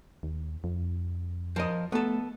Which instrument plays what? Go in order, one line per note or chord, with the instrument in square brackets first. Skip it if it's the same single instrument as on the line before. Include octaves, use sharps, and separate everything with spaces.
[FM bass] D#2
F2
[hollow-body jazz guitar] F3 A#4 D#5
[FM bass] A3 [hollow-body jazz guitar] B3 A4